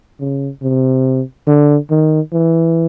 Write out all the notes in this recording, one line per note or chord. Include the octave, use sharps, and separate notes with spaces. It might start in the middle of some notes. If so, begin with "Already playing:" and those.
C#3
C3
D3
D#3
E3